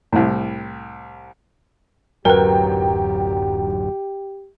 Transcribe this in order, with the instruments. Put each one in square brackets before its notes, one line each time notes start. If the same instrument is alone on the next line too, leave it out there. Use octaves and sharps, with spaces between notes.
[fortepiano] C2 A2
[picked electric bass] D1 F#2 F#3 [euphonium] G4 [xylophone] A#4 B4 [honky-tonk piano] G5 A#5